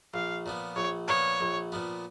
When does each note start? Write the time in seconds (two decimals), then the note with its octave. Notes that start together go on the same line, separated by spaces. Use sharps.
0.14 A#1 F5
0.46 A#2 F3 B3
0.76 A#1 C#5
1.08 A#2 F3 B3 C#5
1.41 A#1
1.72 A#2 F3 B3